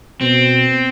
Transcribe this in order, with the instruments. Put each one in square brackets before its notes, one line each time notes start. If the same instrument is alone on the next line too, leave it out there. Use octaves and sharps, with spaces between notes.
[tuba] B2 [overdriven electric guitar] C4